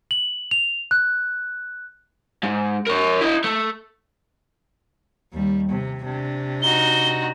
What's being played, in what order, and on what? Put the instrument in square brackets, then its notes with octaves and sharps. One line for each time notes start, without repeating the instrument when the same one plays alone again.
[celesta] F#7
F7
F#6
[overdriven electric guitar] G#2
A#4 C#5
E4 D#5
A3
[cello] D#2 G3
C3
C3 D4
[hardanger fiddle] D#4 F#4 [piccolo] G7